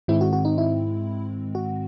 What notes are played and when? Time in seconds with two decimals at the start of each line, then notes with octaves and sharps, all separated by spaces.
0.08 G#2 D#3 G#3 C4 E4
0.21 F#4
0.33 F#4
0.45 D#4
0.58 E4
1.55 F#4